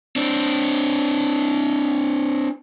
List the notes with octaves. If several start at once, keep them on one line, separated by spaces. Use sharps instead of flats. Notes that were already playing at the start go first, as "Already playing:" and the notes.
C4 D4